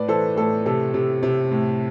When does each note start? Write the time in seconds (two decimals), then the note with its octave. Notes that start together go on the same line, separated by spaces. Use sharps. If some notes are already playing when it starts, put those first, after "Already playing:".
Already playing: A2 B4 D5
0.08 E3 A4 C5
0.36 A2 A4
0.66 C3 A4
0.94 C3
1.23 C3
1.51 A2